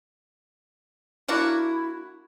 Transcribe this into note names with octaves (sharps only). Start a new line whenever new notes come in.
A#3 D4 E4 F#4